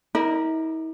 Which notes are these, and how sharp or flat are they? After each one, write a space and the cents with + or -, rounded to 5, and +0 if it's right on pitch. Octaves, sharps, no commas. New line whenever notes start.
E4 -45 A#4 +0 D5 +35